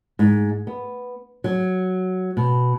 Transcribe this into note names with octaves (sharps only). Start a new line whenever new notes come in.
G#2
B3
F#3
B2